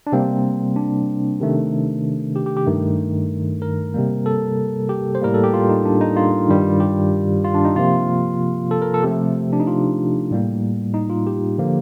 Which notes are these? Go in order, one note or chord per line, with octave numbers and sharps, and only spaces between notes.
D4
C3 G3 A#3 C4
D4
C3 D#3 A3
G4
G4
G4
G2 D#3 A3
A#4
C3 G3 A#3
A4
G4
C5
A2 G3 A#3 A#4
A4
G4
F4
D#4
D4
D#4
F4
G2 D#3 G3
G4
F4
D4
D#4
C3 F3 A#3 F4
A4
A#4
A4
C3 F3 A3 G4
D4
D#4
F4
A2 G3 A#3
D#4
F4
G4
D3 F3 A#3